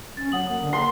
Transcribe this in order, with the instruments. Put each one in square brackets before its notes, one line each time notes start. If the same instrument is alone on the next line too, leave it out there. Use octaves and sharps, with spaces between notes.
[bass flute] C#4 [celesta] A6
[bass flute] F#3 [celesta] F#5 D#6 F#7
[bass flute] A#3
D3
[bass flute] A#3 [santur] C6